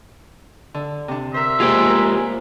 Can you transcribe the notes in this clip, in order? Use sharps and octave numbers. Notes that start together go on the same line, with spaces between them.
D3
C3 D4
A#4 C5 E5
G#3 A#3 F4 G4 G#4 C5
A#4